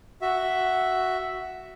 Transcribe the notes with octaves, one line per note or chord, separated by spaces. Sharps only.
F#4 E5